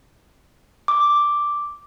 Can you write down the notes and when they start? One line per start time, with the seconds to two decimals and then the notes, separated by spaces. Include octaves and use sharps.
0.88 D6